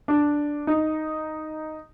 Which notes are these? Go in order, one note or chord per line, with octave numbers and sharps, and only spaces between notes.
D4
D#4